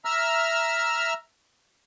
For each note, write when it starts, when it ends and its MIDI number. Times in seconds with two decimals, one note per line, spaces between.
0.05 1.13 76
0.05 1.13 82
0.05 1.13 88
0.05 1.13 89